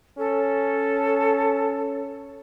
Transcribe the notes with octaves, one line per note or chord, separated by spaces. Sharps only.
C#4 A4